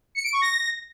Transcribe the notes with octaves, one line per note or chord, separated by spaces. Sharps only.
C#7
D7
C#6
A#6